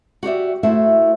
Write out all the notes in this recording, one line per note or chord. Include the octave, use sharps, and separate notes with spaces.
F#4 G4 D5 E5
A3 E4 F#4 C5 E5